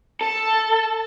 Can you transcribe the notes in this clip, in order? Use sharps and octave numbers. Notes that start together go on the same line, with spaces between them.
A4 A5